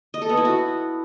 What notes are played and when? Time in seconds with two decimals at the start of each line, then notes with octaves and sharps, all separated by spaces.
0.14 D#5
0.22 A4
0.29 B3
0.37 E4
0.45 F#4